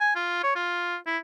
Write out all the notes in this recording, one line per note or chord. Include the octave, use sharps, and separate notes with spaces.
G#5
F4
C#5
F4
E4